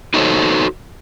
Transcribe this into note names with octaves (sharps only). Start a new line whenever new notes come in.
D#4 F#4 A4 C5 C#5